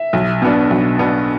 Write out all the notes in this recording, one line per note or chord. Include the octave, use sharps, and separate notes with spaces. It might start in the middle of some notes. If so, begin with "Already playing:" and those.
Already playing: E5
B1
B2 B3 D4
B1
B2 B3 D4